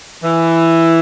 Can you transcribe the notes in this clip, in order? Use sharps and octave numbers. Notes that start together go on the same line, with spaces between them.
E3